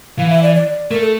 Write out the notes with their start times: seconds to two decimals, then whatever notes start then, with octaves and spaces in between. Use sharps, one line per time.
0.19 E3 F5
0.30 E5
0.43 D5
0.55 D5
0.91 A3 A#4
1.01 A4